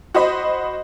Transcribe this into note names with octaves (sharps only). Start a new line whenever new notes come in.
F#4 C5 D#5 B5